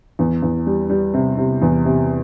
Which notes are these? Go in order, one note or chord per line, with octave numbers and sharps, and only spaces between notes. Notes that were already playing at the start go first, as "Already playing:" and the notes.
E2
E2
G3
G3
C3
C3
E2
C3